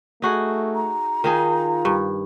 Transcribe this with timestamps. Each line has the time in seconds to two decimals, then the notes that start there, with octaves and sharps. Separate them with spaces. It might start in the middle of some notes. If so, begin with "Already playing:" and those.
0.22 A3 D#4 F#4 G#4
0.75 A#5
1.24 D#3 D#4 F4 G#4
1.85 G2